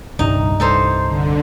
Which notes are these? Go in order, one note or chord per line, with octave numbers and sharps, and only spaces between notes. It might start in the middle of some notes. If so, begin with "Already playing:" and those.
D#1 C2 G2 D#4
C2 D#4 A4 C5
D3